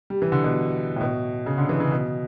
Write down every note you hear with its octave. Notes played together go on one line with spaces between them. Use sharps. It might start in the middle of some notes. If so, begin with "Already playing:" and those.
G3
E3
D3
B2
A2
B2
C#3
D3
E3
C#3
B2